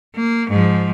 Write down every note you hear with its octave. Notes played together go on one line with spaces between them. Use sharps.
A#3
G#2 F3